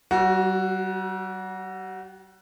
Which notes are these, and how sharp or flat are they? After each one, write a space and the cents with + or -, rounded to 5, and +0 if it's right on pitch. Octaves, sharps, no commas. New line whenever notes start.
G3 -45 F#4 +0